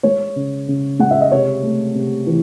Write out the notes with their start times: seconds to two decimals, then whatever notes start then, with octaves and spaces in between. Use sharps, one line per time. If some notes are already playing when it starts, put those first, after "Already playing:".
0.03 G#3 C#5
0.36 C#3
0.68 C#3
0.99 G#3 F#5
1.11 E5
1.21 D#5
1.32 C3 C#5
1.63 A3
1.95 C3
2.27 E3